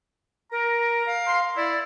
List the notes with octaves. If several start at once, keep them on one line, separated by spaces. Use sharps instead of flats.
A#4 A#5
F5
C6
E4 D5